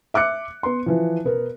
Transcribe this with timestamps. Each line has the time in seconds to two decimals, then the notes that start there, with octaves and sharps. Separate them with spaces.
0.14 E5 D6 F#6 C#7
0.63 B3 C6
0.86 E3 F3
1.24 B2 B3 A#4